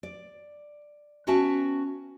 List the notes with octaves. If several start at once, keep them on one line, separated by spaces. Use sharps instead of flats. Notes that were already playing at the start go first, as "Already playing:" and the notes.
D5
B3 C#4 F#4 E5 G5 A5